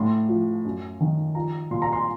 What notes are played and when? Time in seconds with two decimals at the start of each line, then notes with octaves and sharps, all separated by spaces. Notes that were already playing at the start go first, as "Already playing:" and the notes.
Already playing: A2 C6
0.29 F3
0.65 F#2
1.01 D#3
1.35 F3 A#5
1.71 A#2 C6
1.82 A#5
1.93 C6